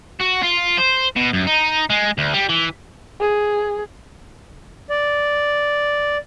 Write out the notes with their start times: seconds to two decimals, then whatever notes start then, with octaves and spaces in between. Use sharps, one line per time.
0.21 F#4
0.44 F4
0.78 C5
1.16 B2
1.33 F#2
1.47 D#4
1.90 G#3
2.18 D2
2.33 G3
2.49 E3
3.20 G#4
4.90 D5